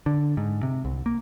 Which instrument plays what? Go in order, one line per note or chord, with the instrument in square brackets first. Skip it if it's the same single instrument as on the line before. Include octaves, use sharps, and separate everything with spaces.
[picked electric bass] D3
G#2
C3
C2
A#3